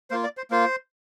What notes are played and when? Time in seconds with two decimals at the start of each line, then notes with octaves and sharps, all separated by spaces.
0.10 A#3 F4 C5
0.24 D5
0.37 C5
0.51 A#3 F4 C5